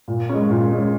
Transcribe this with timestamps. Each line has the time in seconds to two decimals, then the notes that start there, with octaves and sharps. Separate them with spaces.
0.08 A#2
0.29 G#3 C#4
0.50 A#2
0.71 G#3 C#4